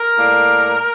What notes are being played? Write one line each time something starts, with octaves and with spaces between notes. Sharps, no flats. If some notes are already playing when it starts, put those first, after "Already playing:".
Already playing: A#4
A2 G3 A#3